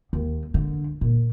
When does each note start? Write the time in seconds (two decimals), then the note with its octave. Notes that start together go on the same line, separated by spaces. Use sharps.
0.13 D#2
0.54 D3
1.01 A#2